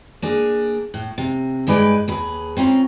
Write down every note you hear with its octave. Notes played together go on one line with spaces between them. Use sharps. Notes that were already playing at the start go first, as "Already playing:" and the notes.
A#3 D4 G#4
A2
C3
G2 G#3 D#4 B4 D5 G#5
D#2 G#4 B4
C4 C#4 F4 A#4